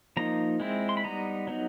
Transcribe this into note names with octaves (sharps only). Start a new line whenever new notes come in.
F3 A#3 D#4 A#5
G#3 C4 E4
C6
B5
G3 B3 D#4 A#5
F#3 B3 D#4